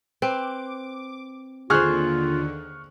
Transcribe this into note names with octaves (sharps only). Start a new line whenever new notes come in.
C4 B4 D6
D#2 D3 F4 G#4 C5 C#6 F6 F#6